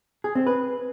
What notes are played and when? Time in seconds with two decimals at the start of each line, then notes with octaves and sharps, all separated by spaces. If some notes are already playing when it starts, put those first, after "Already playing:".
0.24 G#4
0.35 C4
0.47 B4